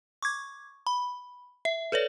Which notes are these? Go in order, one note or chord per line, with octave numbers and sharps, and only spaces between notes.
C#6 D6 G#6
B5
E5
A4 B4 C#5 D5